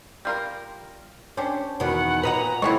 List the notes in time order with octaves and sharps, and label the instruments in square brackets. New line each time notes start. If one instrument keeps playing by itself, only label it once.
[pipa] G3 F4 A#4
[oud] C#4 [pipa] D4 G4 C5
[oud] E2 B2 D#3 [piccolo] F#5
[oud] A#2 [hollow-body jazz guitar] B4 D#5 F#5 [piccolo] A#5
[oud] D#2 [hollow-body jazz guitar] G#3 A3 E4 [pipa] B3 C4 C#6